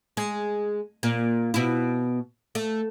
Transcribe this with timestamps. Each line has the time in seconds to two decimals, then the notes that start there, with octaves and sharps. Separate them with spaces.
0.17 G#3
1.03 A#2
1.54 B2 E4
2.55 A3